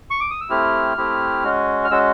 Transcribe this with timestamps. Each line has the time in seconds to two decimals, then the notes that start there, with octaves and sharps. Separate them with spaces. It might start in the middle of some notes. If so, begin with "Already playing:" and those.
0.11 C#6
0.20 D6
0.30 D#6
0.41 E6
0.50 A3 C4 E4 G4 F6
0.97 A3 C4 E4 G4
1.44 G#3 C#4 F#4
1.85 F6
1.90 G#3 C#4 F#4 E6